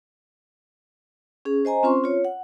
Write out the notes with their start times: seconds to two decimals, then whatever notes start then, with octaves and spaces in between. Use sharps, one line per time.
1.45 C#4 G#4
1.65 C5 D#5 G#5 A#5
1.83 C4 C#4 F4 C5 C6 C#6
2.04 F4 C#5
2.25 F#5